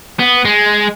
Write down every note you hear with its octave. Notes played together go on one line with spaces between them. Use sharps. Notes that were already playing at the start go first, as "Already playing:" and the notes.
B3
G#3